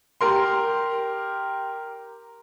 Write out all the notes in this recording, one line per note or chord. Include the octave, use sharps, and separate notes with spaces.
G4 A#4 C6